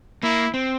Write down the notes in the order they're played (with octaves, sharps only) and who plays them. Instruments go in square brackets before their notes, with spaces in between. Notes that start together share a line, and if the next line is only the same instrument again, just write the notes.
[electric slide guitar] A#3 [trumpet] E4
[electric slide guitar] C4